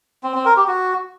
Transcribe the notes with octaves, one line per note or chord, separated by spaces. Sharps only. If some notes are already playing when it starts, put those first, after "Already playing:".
C4
C4
A#4
G4
F#4